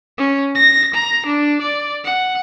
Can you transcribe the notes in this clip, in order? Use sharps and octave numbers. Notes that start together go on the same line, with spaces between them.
C#4
A#6
A#5
D4
D5
F#5